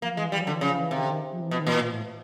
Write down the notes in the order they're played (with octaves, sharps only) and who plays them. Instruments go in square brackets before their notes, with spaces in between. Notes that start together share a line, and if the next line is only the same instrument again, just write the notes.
[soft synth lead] F3 [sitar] A#3
[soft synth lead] F3
[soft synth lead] E3 [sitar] G#3
[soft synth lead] E3 [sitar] G3
[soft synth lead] F#3
[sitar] D3
[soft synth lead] E3
[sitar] C#3 [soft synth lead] F3
[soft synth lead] E3
[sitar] C3 [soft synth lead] D#3
[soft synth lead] D3
D#3
F3
E3
[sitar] B2 [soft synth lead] F3
[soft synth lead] D#3
[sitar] A#2 [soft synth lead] E3
[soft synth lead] A#2
A2